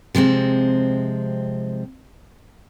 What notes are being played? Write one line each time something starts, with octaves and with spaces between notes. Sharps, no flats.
C3 F3 G#3 C4